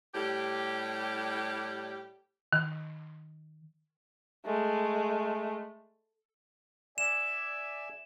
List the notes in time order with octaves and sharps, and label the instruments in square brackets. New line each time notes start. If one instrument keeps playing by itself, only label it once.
[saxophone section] A2 G3 G4
[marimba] D#3
[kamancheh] G#3 A3
[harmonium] D5 E5 G#5 [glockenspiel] E7